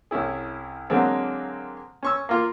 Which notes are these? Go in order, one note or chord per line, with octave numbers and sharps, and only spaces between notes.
C2 C#4 E4 G#4
D3 F#3 G#3 A#3 C4
C#4 C#6 E6
A#3 F4